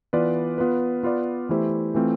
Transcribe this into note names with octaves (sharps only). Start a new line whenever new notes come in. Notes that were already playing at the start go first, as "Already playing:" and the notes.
E3 B3 F4 B4 D5
B3 F4 B4
B3 F4 B4 D5
E3 A3 E4 G4 C5
E3 A3 C4 F4